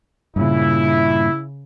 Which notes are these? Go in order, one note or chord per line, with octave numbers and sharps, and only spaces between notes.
G2 A#2 C#3 E4